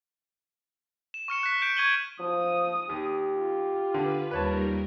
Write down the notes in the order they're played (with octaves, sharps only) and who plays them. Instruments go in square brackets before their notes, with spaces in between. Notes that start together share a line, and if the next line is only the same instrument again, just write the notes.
[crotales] E7
C#6 F6 C#7 E7
F#6 B6
G6 C#7 D7 E7
C#6 G#6 D#7 F#7 G7
[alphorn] F3 [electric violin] D#6
[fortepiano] D#2 [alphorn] G4
[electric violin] F4
[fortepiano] D3 [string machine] B4
[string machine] D#2 G3 A#4 [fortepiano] B4 C#5 A5